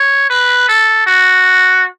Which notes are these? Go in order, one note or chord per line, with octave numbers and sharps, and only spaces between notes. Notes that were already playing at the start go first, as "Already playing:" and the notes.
Already playing: C#5
B4
A4
F#4